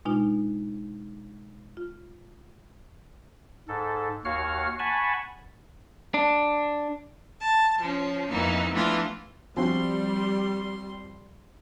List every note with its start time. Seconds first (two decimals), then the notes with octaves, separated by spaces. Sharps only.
0.05 B2 G#3 D4 D#4 F4
1.77 F4
3.68 G#2 A4
4.25 D#2 F#4 C#5 F5 F#5 F6
4.79 F#5 G#5 A5 B5 C#6
6.14 D4
7.40 A5
7.80 F3 C#4
8.29 F2 E3 A#3 B3 D#4
8.72 E3 F3 A3 B3 D4 F4
9.57 F3 G3 C4 F#4 C6